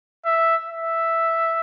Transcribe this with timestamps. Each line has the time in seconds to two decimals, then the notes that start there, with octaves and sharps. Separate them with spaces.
0.25 E5
0.68 E5